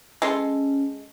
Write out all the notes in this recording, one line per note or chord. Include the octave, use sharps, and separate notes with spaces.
G#3 C#4 A4 C6